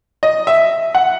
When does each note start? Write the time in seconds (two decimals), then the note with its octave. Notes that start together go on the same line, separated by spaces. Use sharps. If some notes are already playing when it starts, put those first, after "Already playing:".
0.23 D#5
0.47 E5
0.95 F#5